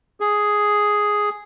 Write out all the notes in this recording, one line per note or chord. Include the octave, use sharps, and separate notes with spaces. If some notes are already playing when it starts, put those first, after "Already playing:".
G#4